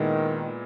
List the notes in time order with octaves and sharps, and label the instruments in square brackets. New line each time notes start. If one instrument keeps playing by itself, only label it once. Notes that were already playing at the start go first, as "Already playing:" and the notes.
Already playing: [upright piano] A#2 G#3 B3 E4 [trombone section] D#3